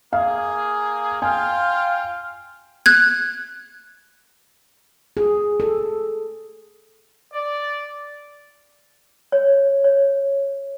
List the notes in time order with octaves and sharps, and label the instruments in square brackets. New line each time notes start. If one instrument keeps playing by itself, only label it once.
[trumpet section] A#3 G#4 [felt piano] F5
[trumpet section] F4 F5 G5 [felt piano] G#5
[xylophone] F#6 G#6
[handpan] G#4
A4
[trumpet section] D5
[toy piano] C#5
C#5